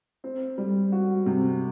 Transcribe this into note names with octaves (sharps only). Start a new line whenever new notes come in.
C4
G3
F#4
C3